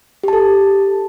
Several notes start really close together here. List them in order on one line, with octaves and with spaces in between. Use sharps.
G4 A5 A4